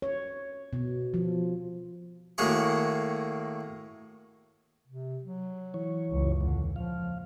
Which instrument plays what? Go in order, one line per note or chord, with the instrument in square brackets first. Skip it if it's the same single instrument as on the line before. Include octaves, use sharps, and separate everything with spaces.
[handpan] C#5
B2
F3
[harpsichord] A2 D#3 A#3 F#4 G#4 C#6
[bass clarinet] C3
F#3
[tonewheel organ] E3 C#5
[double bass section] C#2 F#2
[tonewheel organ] E2 [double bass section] A#2 [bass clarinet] D3
[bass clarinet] F3 [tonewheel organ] F5